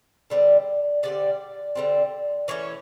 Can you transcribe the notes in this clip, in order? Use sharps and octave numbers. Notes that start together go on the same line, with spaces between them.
D3 G3 C4
D3 G3 C4 D5
D3 G3 C4
E3 A3 C#4 C#5